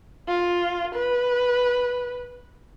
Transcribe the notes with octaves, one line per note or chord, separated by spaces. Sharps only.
F4
B4